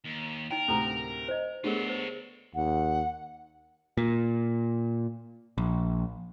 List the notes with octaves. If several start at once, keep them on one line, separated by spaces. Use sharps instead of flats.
D#2
D#4 A#4 G5
D2 A2 C3 A4 A#5
C5 D#5
A3 B3 D4 F4 G4 G#4 A#4 C#5
C5
D#2 F#5
A#2
A#1